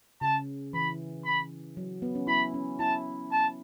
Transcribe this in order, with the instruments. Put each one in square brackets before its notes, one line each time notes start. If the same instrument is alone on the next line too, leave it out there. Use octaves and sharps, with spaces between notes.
[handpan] C#3 [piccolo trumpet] A5
[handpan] E3 [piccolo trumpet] B5
[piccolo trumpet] B5
[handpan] F#3
B3
C#4
[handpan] E4 [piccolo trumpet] B5
[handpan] C#4
[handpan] E4 [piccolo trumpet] A5
[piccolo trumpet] A5